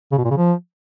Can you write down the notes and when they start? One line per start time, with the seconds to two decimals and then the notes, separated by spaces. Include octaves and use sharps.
0.12 C#3
0.18 B2
0.24 A#2
0.31 C#3
0.37 F3